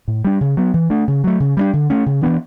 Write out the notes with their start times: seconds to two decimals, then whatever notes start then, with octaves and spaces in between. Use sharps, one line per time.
0.08 A2
0.25 G3 D4
0.41 C#3
0.57 F#3 B3
0.74 E3
0.90 A3 D4
1.08 C#3
1.24 F#3 A3
1.40 C#3
1.57 G3 B3 D4
1.73 D3
1.90 A3 C#4
2.06 C#3
2.23 E3 B3 D4